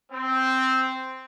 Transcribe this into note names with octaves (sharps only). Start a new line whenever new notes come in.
C4